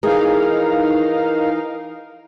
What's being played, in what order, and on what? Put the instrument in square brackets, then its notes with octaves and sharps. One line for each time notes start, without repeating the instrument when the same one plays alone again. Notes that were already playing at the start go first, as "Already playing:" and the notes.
[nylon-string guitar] E3 G#4 [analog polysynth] D#4 F5 [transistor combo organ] A#4